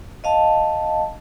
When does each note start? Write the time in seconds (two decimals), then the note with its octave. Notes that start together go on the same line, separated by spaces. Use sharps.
0.24 D#5 F5 A5